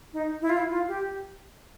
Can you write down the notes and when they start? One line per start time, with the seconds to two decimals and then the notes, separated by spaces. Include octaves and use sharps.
0.13 D#4
0.42 E4
0.49 F4
0.57 E4
0.71 F4
0.88 G4